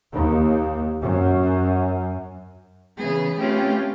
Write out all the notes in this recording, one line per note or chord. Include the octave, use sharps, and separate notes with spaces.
D#2
F#2
C#3 E3 B3 G#4
A3 C4 C#4 F4 G4 B4